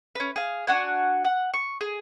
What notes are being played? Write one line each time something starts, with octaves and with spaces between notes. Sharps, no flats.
C#4 B4
G#4 F5
D4 F#4 F#5 G#5
F#5
C#6
G#4